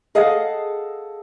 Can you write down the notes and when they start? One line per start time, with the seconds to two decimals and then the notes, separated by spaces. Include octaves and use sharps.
0.15 G#4 A4 D#5 F5 F#5